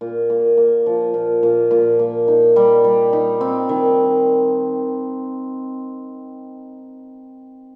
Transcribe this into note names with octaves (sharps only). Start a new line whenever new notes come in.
A#2
A#2
A#3
F3
A#2
A#2
A#2
A#3
D#4
G3
G3
D#4
C4
D#3